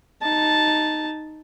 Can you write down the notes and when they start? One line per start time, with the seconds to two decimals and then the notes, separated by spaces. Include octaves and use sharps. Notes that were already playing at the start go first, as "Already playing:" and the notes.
0.22 D#4 A5